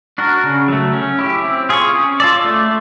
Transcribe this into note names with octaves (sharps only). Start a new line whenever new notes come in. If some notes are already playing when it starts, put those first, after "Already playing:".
D4 F#4 A#4
C#3
F#3 A3
C#4
E4 G4
C4
F4 G#4 C#5
C#4
F4 A4 D5
A3